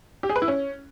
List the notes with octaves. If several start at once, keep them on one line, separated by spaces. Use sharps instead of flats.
G4
G#4
B4
E4
C#4